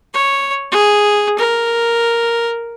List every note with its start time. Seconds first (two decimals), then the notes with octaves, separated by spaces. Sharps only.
0.14 C#5
0.71 G#4
1.38 A#4